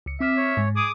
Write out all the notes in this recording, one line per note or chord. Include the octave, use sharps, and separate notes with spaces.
C#2 C#7
C4 E5 D6 F6
C#5
G#2
G#4 D6 D#6